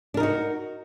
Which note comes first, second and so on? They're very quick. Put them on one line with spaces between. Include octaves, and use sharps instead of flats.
D4 A#4 D#4 F#4